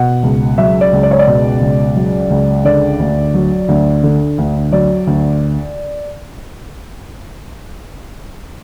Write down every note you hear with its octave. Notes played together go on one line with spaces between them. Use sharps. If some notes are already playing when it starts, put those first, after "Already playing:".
Already playing: B2 F#5
C#2
F#3 E5
D5
C#2
D5
C#5
D5
B2
C#2
F#3
C#2
D3 D5
D2
F#3
D2
D3
D2
F#3 D5
D2